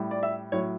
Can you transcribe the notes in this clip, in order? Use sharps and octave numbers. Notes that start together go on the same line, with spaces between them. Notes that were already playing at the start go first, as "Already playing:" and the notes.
Already playing: A2 G3
D5
E5
A2 F#3 C#5